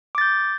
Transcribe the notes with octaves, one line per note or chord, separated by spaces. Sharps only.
D6 G6 A6